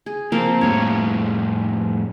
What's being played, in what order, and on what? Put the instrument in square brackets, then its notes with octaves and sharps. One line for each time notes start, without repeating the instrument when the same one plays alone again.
[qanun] G#4
[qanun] F3 A#3 F5 [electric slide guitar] C4
[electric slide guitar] F2 A2 G3 [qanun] C#5